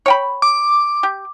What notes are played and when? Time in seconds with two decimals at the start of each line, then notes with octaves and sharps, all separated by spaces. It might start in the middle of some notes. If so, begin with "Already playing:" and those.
0.06 C#5 G5 B5
0.42 D6
1.03 G4